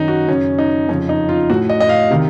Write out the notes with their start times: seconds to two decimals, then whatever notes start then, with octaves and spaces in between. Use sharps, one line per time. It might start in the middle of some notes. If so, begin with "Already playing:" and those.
Already playing: F#2 D#3 D#4
0.08 F#4
0.28 F#2 C#3 C#4
0.58 D#4
0.89 F2 C#3 C#4
1.09 D#4
1.29 F4
1.50 A2 F#4
1.69 D#5
1.80 D#5
1.89 F5
2.10 C3 D#3